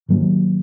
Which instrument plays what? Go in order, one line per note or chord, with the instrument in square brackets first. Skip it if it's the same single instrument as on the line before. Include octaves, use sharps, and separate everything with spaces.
[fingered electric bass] G#2 D#3 F#3 A#3